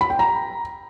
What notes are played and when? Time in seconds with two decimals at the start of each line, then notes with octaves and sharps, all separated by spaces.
0.01 B5
0.10 G5
0.19 A#5